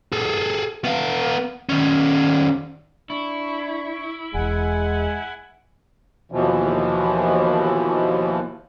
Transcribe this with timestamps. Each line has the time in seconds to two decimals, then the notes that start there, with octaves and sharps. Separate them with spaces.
0.12 G#4 A4
0.84 B3 F5
1.69 D#3 C#4
3.10 D4 E4 C#6
4.34 E1 E2 G#3 F#5 G#5
6.32 D#2 B2 E3 F3